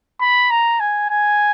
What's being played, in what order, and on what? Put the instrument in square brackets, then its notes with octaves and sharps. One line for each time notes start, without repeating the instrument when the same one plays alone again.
[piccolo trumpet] B5
A#5
G#5
G#5